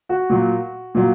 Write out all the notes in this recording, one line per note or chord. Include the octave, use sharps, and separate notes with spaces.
F#4
A#2 F#3
A#2 F#3